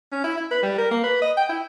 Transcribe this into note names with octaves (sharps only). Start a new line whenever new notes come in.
C#4
E4
E4
B4
G3
A#4
A#3
B4
D#5
G5
E4